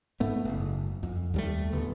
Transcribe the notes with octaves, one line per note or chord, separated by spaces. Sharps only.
G#2 A3 B3
F#1
F2
D#2 G3 A3
D1 D3 B3